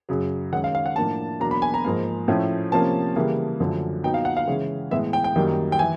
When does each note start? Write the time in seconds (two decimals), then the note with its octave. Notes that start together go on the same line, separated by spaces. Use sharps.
0.09 F#2 C#3 F#3
0.53 D#3 G#3 C#4 F#5
0.64 F5
0.75 F5
0.86 F#5
0.96 A2 F3 A#3 D4 A5
1.40 E2 B2 F#3 A#3 D4 A#5
1.51 B5
1.62 G#5
1.74 A#5
1.85 G#2 F3 A#3
2.28 A2 F3 A3 C#4
2.72 C3 F3 A#3 C#4 A5
3.16 C#3 E3 G3 A#3
3.60 F#2 D3 F3 A3
4.04 A#2 F#3 B3 D#4 G5
4.14 F5
4.25 F#5
4.37 F5
4.47 C#3 E3 G#3 C#4
4.91 A2 E3 G#3 B3 E5
5.13 G5
5.24 G5
5.35 F#2 D#3 G3 A#3 D#4
5.72 G5
5.79 E3 G#5